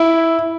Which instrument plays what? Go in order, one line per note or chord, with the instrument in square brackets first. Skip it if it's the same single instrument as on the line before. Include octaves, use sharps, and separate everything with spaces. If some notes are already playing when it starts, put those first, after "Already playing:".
Already playing: [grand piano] E4